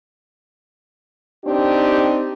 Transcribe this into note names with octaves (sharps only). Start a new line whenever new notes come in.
C4 D4 D#4 G4